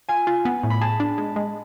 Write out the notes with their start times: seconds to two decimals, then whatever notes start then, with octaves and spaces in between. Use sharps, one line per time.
0.09 F4 G#5
0.27 F4
0.45 B3
0.63 A2
0.70 B5
0.81 G#4 A5
1.00 D4
1.18 G#3
1.36 G#3